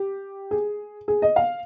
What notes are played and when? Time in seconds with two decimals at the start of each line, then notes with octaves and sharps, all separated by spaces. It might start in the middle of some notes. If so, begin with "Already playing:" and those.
Already playing: G4
0.51 G#4
1.08 G#4
1.22 D#5
1.36 F5